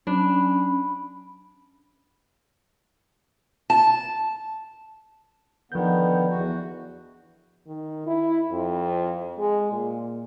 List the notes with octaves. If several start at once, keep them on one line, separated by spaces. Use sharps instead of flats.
F#3 C#4 D4 B5
A5
D3 D#3 F3 B3 G6
E2 F#4
D#3
E4
F2
G#3
A#2